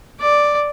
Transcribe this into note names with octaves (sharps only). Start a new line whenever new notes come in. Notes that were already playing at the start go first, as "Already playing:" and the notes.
D5